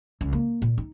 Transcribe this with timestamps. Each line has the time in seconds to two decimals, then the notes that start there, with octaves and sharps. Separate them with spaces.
0.21 C#2
0.33 A#3
0.62 A#2
0.78 D#4